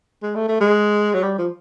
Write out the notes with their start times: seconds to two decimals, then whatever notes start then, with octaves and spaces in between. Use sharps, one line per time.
0.23 G#3
0.35 A3
0.49 A3
0.61 G#3
1.14 F#3
1.23 G3
1.39 F3